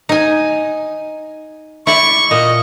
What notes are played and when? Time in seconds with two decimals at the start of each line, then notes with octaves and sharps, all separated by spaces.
0.09 D#4 G#5
1.87 E4 D5 C#6
2.31 A#2 D#5